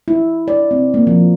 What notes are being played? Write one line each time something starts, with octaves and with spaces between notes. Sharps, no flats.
E4
D5
C4
A#3
F3